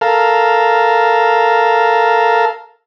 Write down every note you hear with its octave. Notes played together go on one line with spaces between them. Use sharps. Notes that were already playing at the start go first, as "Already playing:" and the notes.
A4 A#4 F5